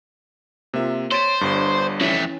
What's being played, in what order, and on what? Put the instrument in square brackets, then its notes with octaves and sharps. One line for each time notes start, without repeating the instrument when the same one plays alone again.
[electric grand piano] C3 E5 [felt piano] A#3 F4
[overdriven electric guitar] C5 [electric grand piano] C#5 [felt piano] A6 B6 D7
[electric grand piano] G1 G2
[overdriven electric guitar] F2 A3 [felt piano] E3 C#4